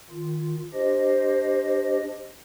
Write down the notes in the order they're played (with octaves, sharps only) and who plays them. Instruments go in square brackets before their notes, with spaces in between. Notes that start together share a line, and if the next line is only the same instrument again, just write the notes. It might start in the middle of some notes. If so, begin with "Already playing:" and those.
[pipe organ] D#3 F4
[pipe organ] D4 G4 D#5 [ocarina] C5